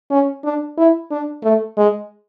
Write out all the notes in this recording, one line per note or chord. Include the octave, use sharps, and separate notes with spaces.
C#4
D4
E4
D4
A3
G#3